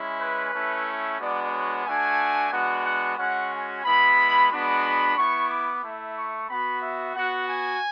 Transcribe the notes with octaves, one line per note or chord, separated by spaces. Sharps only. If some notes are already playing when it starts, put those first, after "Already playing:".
Already playing: G#3 C#4 E4
B4
A3 C#4 E4
G#3 B3 D4 F#4 D5
C#5
A3 D4 F#4 G#5
G#3 B3 D4 F#4 F#5
F#5
G#3 C#4 F#4 F#5
G#5
G#3 B3 E4 B5
G#3 B3 D4 F#4 B5
B3 E4 C#6
D6
A3 E4
C#6
B3 F#4 B5
E5
B3 F#4 F#5
G#5